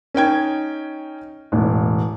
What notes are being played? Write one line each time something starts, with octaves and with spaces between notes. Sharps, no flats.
C#4 D#4 G5 G#6
E1 A1